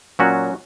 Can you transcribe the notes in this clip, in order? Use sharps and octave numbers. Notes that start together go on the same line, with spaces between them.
A#2 F#3 C#4 F#4